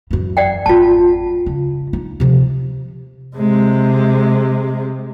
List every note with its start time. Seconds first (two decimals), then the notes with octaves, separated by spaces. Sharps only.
0.11 F#2 E3
0.37 D5 F#5 G5
0.66 G#1 F2 F4 A5
1.46 C#3
1.93 D#4
2.20 C3 F3
3.36 C3 G#3